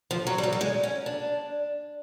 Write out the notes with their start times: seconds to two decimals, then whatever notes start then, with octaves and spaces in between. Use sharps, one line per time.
0.11 F3
0.27 F#3
0.38 G3
0.43 F#3
0.53 G3
0.61 G#3
0.83 C#4
1.06 D4